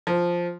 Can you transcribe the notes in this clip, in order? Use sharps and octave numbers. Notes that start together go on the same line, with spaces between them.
F3